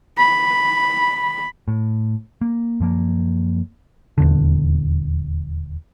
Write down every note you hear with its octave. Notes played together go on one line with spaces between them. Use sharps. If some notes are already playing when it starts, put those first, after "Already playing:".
B5
A2
A#3
F#2 F3 A#3
D#1 E2 D3